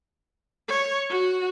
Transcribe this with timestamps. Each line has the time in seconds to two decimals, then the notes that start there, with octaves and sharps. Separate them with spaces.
0.68 C#5
1.09 F#4